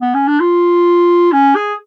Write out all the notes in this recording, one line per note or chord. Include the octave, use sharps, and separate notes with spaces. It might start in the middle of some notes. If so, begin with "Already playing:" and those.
B3
C#4
D4
F4
C#4
G#4